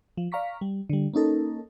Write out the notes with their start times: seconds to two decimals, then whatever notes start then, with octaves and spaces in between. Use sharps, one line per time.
0.17 F3
0.32 D5 F5 A#5 C#6 B6
0.61 G3
0.90 D3 G3
1.14 A#3 C#4 D#4 A4 A#4